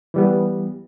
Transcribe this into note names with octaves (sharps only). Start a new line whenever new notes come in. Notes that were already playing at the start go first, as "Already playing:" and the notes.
E3 G3 B3